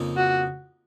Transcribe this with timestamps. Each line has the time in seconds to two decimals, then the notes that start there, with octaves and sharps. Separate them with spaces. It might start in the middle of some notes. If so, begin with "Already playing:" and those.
Already playing: F2 C#3 F3 A#3 D#4
0.16 F#4